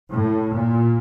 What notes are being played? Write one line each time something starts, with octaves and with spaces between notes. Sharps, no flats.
A2
A#2